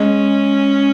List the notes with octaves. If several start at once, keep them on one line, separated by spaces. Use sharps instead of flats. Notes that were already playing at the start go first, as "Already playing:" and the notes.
Already playing: G#3 C#4